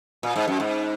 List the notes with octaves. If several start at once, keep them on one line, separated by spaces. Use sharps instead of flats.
A#2
G#2
F#2
G#2